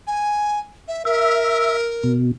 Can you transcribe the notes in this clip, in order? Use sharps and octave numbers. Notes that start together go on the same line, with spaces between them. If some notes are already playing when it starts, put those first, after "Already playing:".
G#5
E5
A#4 E5
B2